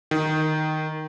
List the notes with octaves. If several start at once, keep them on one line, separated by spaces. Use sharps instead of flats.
D#3